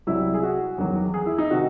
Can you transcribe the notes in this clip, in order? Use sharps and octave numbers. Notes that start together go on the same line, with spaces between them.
C2 C3 F#3 E4
G#4
F#4
E2 D#3 F#3
G#4
E4
D#4
C3 D#3 F#4